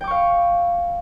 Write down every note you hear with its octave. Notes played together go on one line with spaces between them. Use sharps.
F5 G5 C#6 D6